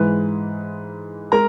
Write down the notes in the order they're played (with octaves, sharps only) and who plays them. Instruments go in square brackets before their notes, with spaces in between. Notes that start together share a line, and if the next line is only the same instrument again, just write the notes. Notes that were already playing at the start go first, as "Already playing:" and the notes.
Already playing: [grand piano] G#2 E3 G#3 B4
G#3 A#4 A#5